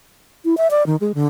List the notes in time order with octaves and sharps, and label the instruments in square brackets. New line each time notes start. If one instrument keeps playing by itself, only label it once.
[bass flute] E4
E5
D5
D#3
G#3
D3